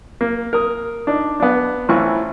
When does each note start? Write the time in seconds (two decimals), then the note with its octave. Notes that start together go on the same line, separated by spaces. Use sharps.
0.21 A#3
0.53 A#4 D#6
1.07 D4 D#4
1.40 B3 D4
1.89 A1 E3 C4 F4 C#6